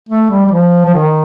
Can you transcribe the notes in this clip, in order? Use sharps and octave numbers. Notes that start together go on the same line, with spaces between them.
A3
G3
G3
F3
F3
D#3